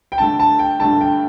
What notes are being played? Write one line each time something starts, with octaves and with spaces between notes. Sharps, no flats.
G5
G2 D3 A3 D4 A5
A5
G5
G2 D3 A3 D4 A5
G5